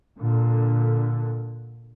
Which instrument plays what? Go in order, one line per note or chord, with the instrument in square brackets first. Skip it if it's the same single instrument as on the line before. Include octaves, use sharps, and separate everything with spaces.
[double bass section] A#2 D3